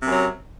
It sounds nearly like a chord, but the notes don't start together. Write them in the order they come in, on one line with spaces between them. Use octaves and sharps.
C3 F#2 F#3